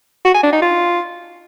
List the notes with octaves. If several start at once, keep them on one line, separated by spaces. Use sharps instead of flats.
F#4
G#5
D4
D#4
F4